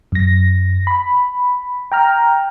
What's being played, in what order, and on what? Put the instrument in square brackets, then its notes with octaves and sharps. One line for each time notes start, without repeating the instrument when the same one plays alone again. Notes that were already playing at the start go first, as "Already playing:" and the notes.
[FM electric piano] F#2 A#6
B5
G5 A#5 F6